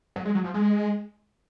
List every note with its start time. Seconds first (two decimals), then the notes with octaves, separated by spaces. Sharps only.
0.16 F#3
0.25 G#3
0.35 F#3
0.44 F3
0.54 G#3